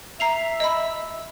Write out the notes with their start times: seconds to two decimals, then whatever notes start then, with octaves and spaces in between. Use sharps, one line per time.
0.20 E5 A#5 C7 F7
0.60 D#5 B5